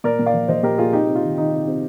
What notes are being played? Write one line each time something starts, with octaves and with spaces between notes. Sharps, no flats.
A#2 A#4 D5
A#2
D5 F5
F3
F3 C5 D#5
A#2 G4 A#4
A#2 F4 G#4
C3 D#4 G4
C3
F4
D#3
D#3 D#4
C3
C3